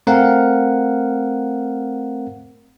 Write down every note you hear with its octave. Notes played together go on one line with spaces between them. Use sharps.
A3 C4 A#4 F5 F#5